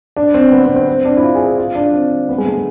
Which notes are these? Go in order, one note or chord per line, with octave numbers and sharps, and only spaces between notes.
D4
C4
B3
C4
C4
C4
D4
E4
F4
G#4
G#4
F4
D4
C4
B3
G#3
A3